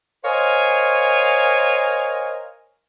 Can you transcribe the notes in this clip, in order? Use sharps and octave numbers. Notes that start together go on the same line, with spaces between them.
A#4 C5 C#5 D#5 F5 G#5